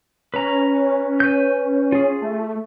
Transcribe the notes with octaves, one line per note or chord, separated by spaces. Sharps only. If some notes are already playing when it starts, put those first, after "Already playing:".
C#4 B4 A#5
B4 G6
F4 G#4
A3